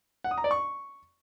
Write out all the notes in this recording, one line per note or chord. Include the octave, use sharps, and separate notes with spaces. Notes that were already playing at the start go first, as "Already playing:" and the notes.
F#5
D#6
A#5
D5
C#6